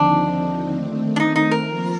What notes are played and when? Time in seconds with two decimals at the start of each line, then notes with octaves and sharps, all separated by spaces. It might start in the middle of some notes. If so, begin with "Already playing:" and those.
Already playing: D#2 D3 F3 C4 D4 D#4
0.73 D#3 A3 C4
1.16 D4
1.20 D#4
1.36 D#4
1.51 A#4
1.67 F3 A#3 F4